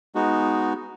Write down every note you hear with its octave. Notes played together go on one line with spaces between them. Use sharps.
G#3 B3 D#4 F#4